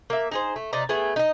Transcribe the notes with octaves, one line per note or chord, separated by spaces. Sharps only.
A#3 E5
D#4 G#4 C5
A3
C3 D#4 D5 A#5
A3 B3 G#4
D#4 D#5